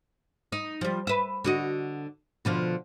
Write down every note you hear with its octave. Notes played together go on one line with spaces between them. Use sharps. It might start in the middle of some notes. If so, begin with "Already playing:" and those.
D#4
F3 G3
B4 E5
D3 F#4 D#5
B2 D3 F3